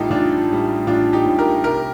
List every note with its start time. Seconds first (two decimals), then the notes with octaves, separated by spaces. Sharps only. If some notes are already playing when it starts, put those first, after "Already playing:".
Already playing: A1 A2 G3 D#4 F4 G4 A4
0.10 A1 D4 F4
0.49 A2 G3
0.87 A1 D4 F4
1.13 D#4 G4
1.26 A2 G3
1.38 G4 A#4
1.64 C2 G4 A#4